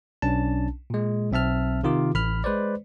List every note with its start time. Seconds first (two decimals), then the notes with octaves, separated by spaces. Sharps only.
0.22 B1 C#4 D4 A5
0.90 A#2 G#3
1.32 B1 C4 E5 A5 F6
1.83 C3 D#3 F4 A#4 D6
2.14 A1 B5 F6
2.44 G#3 B4 C5 D5